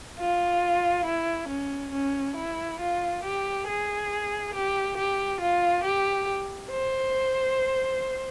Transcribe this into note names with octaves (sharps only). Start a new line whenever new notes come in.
F4
E4
C#4
C#4
E4
F4
G4
G#4
G4
G4
F4
G4
C5